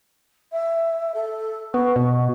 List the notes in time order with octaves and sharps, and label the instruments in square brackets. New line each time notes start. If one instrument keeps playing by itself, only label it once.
[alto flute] E5
A4
[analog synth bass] B3 [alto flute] C#6
[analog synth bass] B2